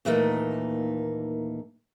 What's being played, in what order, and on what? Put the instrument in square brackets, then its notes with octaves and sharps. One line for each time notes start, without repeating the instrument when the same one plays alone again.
[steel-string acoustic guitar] D#2 A#2 E3 A3 D#4